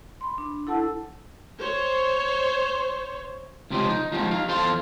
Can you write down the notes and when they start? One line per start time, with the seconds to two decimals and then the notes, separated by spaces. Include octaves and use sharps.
0.21 B5 C6
0.38 D4
0.67 E4 A4 F#5 A5 E6
1.59 C5 C#5
3.70 C#2 C3 F3 G4 C5 D#5
3.89 D#4
4.12 F3 G#3 C4 D#4
4.31 D#4 F5
4.48 E2 F3 A4 C5 F5 C6